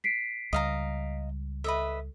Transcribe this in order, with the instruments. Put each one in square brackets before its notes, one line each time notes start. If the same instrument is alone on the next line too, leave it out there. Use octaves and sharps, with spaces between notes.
[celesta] B6 C7 D7
[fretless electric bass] C#2 G3 [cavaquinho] D#5 F5 A#5
[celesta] A4 [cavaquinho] B4 D#5 E5